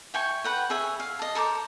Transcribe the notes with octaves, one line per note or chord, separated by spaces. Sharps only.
E5 G5 G#5 C#6
B4 F#5 G5
G#4 C#5 E5 G#5
F5
D#5 A5
A4 A#4 C5 D6